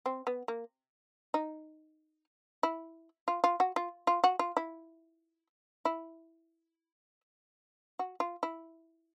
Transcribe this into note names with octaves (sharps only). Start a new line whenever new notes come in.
C4
B3
A#3
D#4
E4
F4
F4
F#4
F4
F4
F#4
F4
E4
E4
F#4
F4
E4